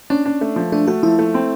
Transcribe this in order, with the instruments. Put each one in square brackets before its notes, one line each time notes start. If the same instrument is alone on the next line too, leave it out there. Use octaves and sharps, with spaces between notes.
[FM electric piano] C#4 [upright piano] D4
[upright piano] D4
A3
F3
[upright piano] A3 [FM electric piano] D4
[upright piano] A3 [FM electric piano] F#4
[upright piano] F3 [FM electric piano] E4
[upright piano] A3
C4